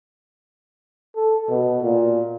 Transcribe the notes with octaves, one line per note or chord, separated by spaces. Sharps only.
A4
B2
A#2